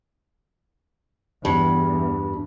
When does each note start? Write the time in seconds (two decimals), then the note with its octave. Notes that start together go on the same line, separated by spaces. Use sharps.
1.45 E2 G2